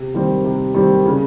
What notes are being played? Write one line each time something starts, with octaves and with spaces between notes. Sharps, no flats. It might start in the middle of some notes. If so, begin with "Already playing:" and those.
Already playing: C3
D#3 G3 C4
C3
D#3 G3 C4
C#3